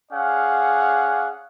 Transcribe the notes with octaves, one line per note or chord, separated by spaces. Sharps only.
C#4 G#4 D5 F5 F#5